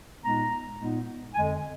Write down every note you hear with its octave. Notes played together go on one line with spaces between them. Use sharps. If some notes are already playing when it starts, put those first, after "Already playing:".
A#2 G#3 B3 D#4 A#5
A#2 G#3 B3 D#4
F2 D3 G#3 G#5